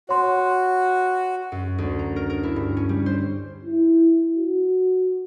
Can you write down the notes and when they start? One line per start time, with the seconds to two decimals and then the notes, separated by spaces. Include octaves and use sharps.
0.09 F#4 C#5 C6
1.52 F#2
1.78 D2
1.99 A#5
2.16 A#4
2.30 A#4
2.43 E4
2.56 G2
2.77 C#4
2.89 G3
3.06 C5
3.65 E4
4.38 F#4